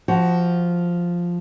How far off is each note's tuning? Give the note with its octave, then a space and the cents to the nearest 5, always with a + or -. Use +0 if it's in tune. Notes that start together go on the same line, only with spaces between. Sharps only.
F3 +0 F#4 +15